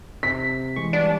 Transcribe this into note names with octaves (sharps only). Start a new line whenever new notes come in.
C3 B6
E3 G#3 C#6
G3 B3 D4